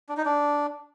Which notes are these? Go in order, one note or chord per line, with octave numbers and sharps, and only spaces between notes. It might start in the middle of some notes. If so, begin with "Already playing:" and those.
D4
D#4
D4